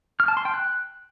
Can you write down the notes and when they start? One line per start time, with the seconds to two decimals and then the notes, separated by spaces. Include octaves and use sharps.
0.20 F6
0.28 A5
0.37 C6
0.45 G5
0.54 F#6